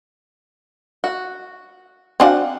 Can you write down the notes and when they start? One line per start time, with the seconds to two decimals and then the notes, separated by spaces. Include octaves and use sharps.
1.04 F#4
2.20 C4 D4 F#4 F5 F#5 G#5